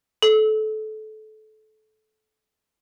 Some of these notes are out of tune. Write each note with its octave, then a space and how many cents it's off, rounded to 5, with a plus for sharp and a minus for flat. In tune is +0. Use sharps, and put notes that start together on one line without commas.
A4 -25